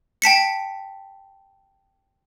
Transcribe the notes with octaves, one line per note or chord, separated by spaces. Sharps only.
G5 A5 B6 C#7